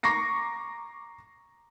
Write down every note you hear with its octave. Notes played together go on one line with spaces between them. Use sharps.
A#5 C#6 D6 A#6 C7